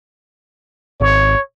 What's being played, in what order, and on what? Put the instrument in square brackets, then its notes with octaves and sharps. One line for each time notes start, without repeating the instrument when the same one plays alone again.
[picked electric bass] G#1 [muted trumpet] C#5